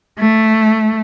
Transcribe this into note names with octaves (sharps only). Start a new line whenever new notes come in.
A3